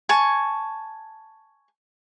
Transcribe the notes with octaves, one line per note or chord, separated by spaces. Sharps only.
G#5 A5 C#6